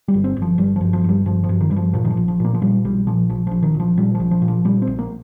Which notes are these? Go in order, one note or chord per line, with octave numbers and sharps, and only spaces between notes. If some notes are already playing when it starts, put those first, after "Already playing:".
G3
G1
C4
G1
F3
G1 G3
G2 F3
F3
G1 G3
G2 F3
F3
G2
D#3
G2 G3
F3
A#2 F3
D#3
F3
A#1
F3
A#2 A#3
F3
A#2 G3
A#1 G3
A#2 F3
A#1 F3
A#1 F3
D#3
A#1
F3
A#2 G3
F3
A#1
F3
A#2
F3
A#2 G3
C4
A#1
A#3